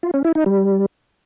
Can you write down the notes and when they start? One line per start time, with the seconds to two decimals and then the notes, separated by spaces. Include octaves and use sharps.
0.03 F4
0.14 C#4
0.25 E4
0.35 D#4
0.46 G3